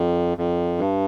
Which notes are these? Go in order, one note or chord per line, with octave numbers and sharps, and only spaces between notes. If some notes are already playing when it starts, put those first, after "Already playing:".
Already playing: F2
F2
G2